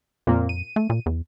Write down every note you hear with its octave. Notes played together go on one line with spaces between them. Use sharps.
F2 A#2 A#3 C4
D#7
A3
A#2
E2